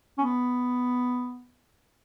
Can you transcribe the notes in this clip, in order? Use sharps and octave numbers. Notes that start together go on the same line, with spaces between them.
C#4
B3